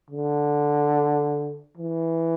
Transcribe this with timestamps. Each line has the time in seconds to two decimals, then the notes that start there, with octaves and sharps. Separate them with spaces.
0.10 D3
1.78 E3